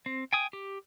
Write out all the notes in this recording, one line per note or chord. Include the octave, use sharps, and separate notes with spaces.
C4
G5 G#5 D#6
G4